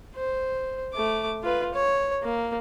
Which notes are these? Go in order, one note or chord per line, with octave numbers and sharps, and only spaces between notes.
C5
A3 D6
F4 B4
C#5
A#3